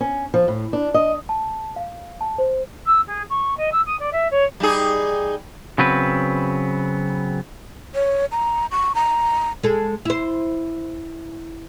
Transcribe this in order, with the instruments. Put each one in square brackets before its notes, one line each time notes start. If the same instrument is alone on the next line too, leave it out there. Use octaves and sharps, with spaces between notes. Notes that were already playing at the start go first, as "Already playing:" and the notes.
[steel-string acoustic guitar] C#4
F3
A2
D4
D#5
[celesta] A5
F5
A5
C5
[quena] E6
G#4
C#6
D#5
E6
D#6
D5
E5
C#5
[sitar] G3 D#4 G#4
[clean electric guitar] C#3 F#3 B3 C4 B4
[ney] C#5
A#5
C#6
A#5
[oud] G#3 A4
E4 C5